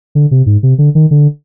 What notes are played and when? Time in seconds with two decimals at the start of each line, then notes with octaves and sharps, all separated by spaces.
0.15 D3
0.31 C3
0.46 G#2
0.63 C3
0.78 D3
0.95 D#3
1.11 D3